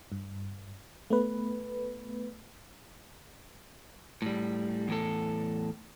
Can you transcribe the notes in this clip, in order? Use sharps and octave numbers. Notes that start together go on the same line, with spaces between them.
G2
A3 B3 B4
A2 G3
E2 A2 A4